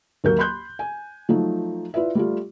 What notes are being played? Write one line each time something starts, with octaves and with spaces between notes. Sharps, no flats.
D#2 F#3 A#3 A#4 G6
B5 C6 F#6 G6
G#5
F3 F#3 A3 D#4
E4 F4 B4 D5 E5
G3 A3 F4